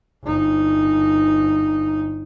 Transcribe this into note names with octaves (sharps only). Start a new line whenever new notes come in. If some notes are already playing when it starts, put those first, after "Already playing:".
G1 D#4